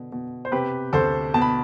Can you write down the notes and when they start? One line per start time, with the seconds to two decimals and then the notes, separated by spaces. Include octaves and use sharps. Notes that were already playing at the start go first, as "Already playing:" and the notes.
Already playing: B2 D3
0.12 B2
0.45 C5
0.52 C3 G4 B4
0.93 D2 A4 C5
1.34 B2 A5
1.42 B5